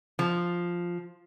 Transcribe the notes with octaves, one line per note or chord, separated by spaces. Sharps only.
F3